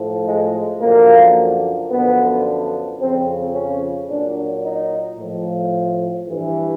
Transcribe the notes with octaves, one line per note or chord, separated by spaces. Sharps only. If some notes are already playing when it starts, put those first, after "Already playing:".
Already playing: A2 F3
G#3
F#2 D3 F3 A#3
F#2 D3 F3 B3
F2 C#3 F3 C4
C#4
A#2 F#3 D4
D#4
A2 F3
G2 E3